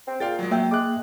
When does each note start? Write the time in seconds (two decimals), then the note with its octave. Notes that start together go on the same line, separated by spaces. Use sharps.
0.07 C4
0.20 A#2 G#4 F5 G5 A6
0.39 F#3 G#3
0.51 F#3 A#3 E5 G5
0.71 G#3 D6 F#6